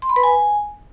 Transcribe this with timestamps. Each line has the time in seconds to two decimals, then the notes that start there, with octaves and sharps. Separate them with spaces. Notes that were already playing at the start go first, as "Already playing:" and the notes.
0.02 C6
0.09 B5
0.16 B4
0.23 G#5